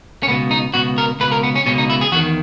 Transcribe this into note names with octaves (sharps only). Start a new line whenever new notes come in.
C#4
C#2 B2 B3
D#4
C#2 B2 F#4
A#4
C#2 B2 B4
A#4
B3
C#4
C#2 B2 C#4
D#4
E4
G#4
E2 D#3 F#4